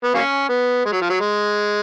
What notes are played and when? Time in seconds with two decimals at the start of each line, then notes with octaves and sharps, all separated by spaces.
0.04 B3
0.14 F#3 A#3 C#4
0.49 B3
0.85 G#3
0.92 F#3
1.01 F3
1.10 F#3
1.21 G#3